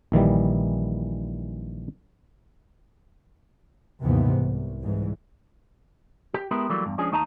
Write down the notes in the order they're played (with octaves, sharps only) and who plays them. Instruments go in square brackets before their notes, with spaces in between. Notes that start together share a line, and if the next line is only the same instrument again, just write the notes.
[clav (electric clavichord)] A#1 D#3 E3 G3
[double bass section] D#2 G#2 C3 E3 B3
C2
C2 G#2 E3
[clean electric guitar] G4
G#3 B3 E4 G4 A#4
E3 F#3 G3 A3 A#3
E2 G2
F3 G#3 C#4 D4 G#4
D#2 A3 D#4 D#5 A5 A#5